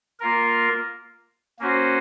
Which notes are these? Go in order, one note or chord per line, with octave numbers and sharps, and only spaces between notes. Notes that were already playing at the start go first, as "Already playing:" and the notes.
A#3 F4 A#4
A#3 C#4 F#4 C5